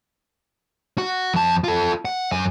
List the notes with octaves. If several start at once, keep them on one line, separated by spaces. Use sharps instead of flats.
F#4
F2 A5
F4 A4
F#5
F#2 G#5